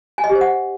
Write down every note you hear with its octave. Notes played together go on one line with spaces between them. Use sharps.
G#5
D#5
G4
C5
F#5